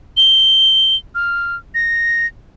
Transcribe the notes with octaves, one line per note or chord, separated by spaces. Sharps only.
G7
F6
A#6